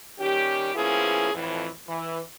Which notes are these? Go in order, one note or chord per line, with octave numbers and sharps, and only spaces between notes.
D#3 G3 C#4 G4
F3 A#3 B3 C#4 E4 G#4
F2 A2 E3
E3